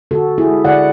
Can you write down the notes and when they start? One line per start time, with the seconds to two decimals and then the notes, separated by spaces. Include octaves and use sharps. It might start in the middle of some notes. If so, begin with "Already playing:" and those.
0.11 D3 F#4 A4
0.28 D3
0.38 E4 G#4
0.47 G#3
0.65 D3 D5 F#5